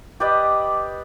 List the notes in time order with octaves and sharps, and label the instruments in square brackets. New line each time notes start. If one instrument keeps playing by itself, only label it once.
[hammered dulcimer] G4 B4 D5 D#5